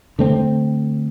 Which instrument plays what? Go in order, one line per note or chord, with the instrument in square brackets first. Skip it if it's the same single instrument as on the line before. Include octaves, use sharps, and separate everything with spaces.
[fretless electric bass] D3 A3 C4